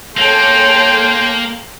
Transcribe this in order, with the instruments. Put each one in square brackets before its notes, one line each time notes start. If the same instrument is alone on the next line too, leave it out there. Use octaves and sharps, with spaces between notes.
[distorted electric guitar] A#3 [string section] G#4 A4 C#5 [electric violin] G5 C6